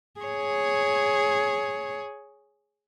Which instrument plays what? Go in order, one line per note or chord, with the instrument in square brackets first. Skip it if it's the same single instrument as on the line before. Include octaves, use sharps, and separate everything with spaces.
[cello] G#4 C#5